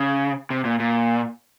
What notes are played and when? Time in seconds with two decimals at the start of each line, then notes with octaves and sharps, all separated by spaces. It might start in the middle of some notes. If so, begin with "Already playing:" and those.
Already playing: C#3
0.50 C3
0.65 A#2
0.80 A#2